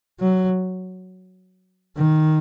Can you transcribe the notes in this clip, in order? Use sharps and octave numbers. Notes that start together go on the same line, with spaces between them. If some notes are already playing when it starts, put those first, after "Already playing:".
F#3
D#3